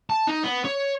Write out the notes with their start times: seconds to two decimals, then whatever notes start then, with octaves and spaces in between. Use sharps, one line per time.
0.10 A5
0.27 D#4
0.44 B3
0.65 C#5